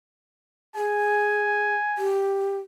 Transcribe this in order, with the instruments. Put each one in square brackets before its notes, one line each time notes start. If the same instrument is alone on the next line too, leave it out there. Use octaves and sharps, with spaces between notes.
[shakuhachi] G#4 [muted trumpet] G#5
[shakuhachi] G4